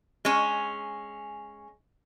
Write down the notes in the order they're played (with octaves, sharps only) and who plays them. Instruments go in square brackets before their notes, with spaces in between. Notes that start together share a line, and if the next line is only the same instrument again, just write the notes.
[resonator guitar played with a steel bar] G#3 C#4